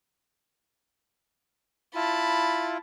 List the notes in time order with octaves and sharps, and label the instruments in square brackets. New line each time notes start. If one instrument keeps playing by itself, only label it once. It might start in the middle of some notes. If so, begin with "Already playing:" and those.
[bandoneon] E4 F4 [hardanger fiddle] A5 B5